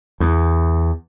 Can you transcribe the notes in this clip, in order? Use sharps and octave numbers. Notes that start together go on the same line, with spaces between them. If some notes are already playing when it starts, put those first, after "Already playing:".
E2